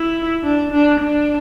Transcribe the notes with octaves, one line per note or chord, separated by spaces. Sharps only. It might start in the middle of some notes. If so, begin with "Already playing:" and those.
Already playing: E4
D4
D4
D4